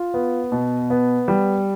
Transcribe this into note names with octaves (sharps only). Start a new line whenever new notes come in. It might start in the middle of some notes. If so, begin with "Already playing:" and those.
Already playing: F4
B3
B2
B3
G3